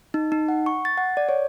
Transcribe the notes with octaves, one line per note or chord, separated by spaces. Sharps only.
D#4
D#4
F#5
C#6
A6
F#5
D5
C#5